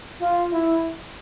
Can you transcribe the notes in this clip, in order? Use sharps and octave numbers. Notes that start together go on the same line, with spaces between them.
F4
E4